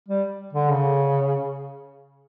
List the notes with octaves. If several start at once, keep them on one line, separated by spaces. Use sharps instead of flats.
G3
D3
C#3